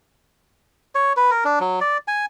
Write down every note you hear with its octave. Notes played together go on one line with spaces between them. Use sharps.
C#5
B4
A#4
D4
F#3
D5
G#5